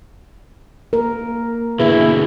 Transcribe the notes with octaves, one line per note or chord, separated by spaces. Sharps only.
A#3 A#4
B2 D3 E4 G#4 B4